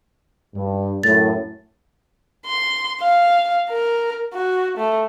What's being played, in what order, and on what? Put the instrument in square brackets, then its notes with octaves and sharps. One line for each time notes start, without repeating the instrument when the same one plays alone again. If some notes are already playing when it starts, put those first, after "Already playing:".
[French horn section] G2
[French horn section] F#2 A2 [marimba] A6
[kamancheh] C6
F5
A#4
F#4
A3